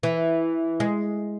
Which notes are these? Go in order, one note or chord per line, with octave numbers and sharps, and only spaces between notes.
E3
G#3